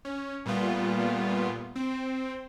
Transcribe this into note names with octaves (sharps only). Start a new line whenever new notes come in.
C#4
A#2 G3 A3 B3 F4
C4